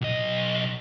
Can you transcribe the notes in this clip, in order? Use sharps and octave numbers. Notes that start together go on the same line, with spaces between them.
B1 D#5